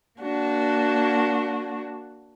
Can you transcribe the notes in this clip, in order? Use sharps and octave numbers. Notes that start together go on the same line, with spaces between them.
A#3 D4 F#4